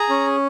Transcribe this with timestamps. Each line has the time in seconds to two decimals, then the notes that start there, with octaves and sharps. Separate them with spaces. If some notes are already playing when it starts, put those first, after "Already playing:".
Already playing: G#4 A#5
0.09 C#4